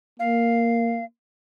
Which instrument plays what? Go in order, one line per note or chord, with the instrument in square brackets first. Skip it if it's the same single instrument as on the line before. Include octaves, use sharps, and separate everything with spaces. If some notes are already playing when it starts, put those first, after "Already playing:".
[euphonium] A#3 [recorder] F5